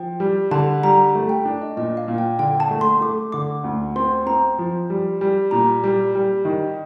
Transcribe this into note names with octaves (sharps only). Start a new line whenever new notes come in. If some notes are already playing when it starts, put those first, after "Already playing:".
Already playing: F3 G5
G3
D3 A5
G3 A#5
A3
G5
D4
D#5
A#2 D#5
F5
A#2
G5
D3 G5
A5
A3
C6
A3 D6
D3 D6
D2
C4 C6
C4 A#5
F3
G3
G3
A#2 A#5
G3
G3
D#3